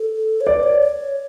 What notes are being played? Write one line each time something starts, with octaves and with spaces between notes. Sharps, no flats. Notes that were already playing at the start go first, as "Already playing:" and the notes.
Already playing: A4
C#5
B4 D5
C#5
C#5